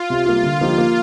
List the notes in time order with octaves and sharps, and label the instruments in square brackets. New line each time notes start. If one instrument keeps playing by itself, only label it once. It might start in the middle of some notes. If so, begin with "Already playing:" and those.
Already playing: [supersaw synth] F4
[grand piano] C3
G3 A#3 F4
[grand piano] D3 [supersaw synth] F4
[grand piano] F3 A#3 D#4 G4
A#3